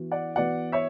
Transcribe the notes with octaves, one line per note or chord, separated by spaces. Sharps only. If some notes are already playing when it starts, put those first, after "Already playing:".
Already playing: E3 B3 F#4
D5 F#5
E3 B3 F#4 D5 F#5
C#5 E5